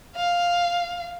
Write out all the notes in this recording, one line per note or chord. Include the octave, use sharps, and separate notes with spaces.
F5